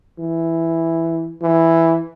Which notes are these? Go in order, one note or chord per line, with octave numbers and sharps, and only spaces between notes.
E3
E3